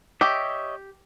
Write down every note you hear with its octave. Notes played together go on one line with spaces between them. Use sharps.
G4 C#5 D#5 E5